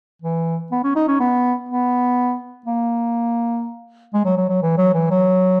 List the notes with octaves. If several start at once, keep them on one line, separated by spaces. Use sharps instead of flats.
E3
B3
C#4
D#4
C#4
B3
B3
A#3
G#3
F#3
F#3
F#3
E3
F#3
E3
F#3